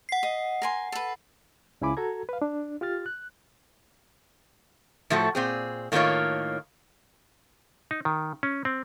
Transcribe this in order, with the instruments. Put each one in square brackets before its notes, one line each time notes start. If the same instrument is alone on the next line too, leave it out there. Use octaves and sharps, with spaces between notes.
[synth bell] F#5 C7
[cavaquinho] D#5
A#4 G#5 C6
A4 B4
[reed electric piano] C#2 C#3 E4 G#5 B5 D6
F#4 A4 A#5 G#6
B4 F5
D4
F4 G4 F6 A6
F#6
[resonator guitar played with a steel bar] A2 F3 A3 F#4 A4
A#2 C4 G#4
A2 D#3 A#3 D4 F4 C#5
[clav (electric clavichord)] D#4
D#3
C#4
C4